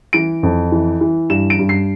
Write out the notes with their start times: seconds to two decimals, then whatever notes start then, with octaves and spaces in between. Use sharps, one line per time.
0.13 E3 D7
0.43 F2
0.72 E3
1.01 E3
1.30 G2 E7
1.50 D7
1.59 G2
1.69 C7